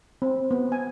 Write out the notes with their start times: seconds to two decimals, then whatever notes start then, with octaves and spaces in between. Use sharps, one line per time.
0.22 C4
0.51 B3
0.72 G#5